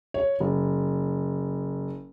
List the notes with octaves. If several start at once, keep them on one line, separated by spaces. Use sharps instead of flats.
C#5
F#1